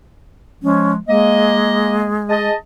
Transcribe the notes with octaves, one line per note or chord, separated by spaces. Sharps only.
F3 G#3 C#4
G#3 A#3 D#5
G#4 D#5 A5